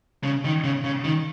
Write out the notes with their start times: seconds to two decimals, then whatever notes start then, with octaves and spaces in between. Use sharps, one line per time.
0.24 C#3
0.45 D#3
0.64 C#3
0.84 C#3
1.04 D#3